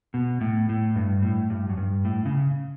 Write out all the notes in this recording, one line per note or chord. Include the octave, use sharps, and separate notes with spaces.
B2
A2
A2
G2
A2
G2
F#2
G2
A2
C#3